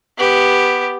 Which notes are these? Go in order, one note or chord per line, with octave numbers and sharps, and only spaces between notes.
B3 G4